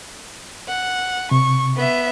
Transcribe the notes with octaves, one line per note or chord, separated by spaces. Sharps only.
F#5
C3 C#6
B3 E5